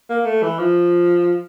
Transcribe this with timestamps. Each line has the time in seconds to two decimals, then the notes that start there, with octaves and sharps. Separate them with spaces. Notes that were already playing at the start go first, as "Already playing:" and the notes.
0.10 A#3
0.26 A3
0.43 E3
0.59 F3